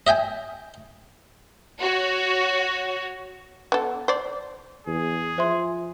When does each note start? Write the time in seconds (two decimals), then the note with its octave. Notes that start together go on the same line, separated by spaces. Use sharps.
0.07 D#5 E5 G5 G#5
1.80 F#4 C#5
3.72 B3 A4
4.08 C5 D5
4.87 E2 G#4
5.38 F3 C5 E5 C6